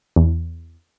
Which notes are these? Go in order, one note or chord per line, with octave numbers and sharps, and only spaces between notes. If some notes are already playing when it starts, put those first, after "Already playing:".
E2